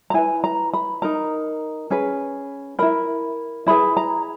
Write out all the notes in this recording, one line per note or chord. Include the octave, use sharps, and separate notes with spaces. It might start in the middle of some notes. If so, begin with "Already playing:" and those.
A#5
E4 B4 G#5
A#5
B5
D#4 A#4 A#5
C#4 G#4 B4
E4 A#4 B5
E4 G#4 B4 B5
A#5